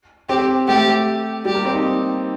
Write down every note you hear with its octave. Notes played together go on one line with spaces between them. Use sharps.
C4 G4
A3 G4
G3 G4
A#3
C4
D#4